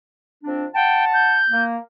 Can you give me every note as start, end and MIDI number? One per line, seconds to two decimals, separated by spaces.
0.44 0.65 41
0.44 0.65 60
0.44 0.65 62
0.74 1.39 78
0.74 1.05 79
0.74 1.39 81
1.13 1.64 91
1.50 1.77 58